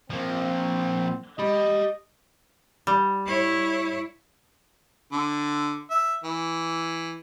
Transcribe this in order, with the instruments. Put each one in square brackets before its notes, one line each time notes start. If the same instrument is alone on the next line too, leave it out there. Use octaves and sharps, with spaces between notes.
[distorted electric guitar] F3 A#3 [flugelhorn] C4
[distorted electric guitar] G4 B5 [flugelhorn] D#5
[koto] G3
[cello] E4 C#5
[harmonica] D3
E5
E3